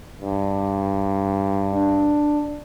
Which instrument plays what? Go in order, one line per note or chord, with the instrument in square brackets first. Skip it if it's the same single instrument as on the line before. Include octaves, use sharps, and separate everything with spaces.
[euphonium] G2
[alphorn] D4